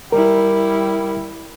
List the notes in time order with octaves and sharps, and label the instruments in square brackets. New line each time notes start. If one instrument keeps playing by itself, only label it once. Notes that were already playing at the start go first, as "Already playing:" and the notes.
[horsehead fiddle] G3 E4 [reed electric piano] A#4